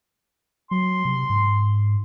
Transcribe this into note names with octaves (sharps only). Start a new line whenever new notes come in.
F#3 C6
C3
G#2